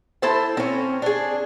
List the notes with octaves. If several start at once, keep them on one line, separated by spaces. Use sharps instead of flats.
E4 A4 C5 A5
C4 C#4
D4 G#4